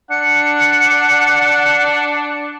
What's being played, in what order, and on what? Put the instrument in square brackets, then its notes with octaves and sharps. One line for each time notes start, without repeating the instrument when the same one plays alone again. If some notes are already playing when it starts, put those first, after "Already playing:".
[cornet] D4 [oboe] F#5 [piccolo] C#7